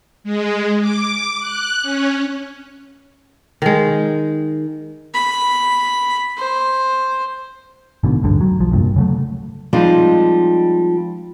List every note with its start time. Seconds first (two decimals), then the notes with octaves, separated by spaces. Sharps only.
0.24 G#3
0.81 D6
1.40 F#6
1.82 C#4
3.62 D#3 G#3
5.14 B5
6.37 C5
8.03 A1 G#2 B2 D3
8.22 A1 D2 G2 D3
8.41 F#3
8.59 B1 F3
8.71 F1 C2 G2 A#2
8.96 C#3 F#3 A3
9.73 F3 G3 G#3 C4 D#4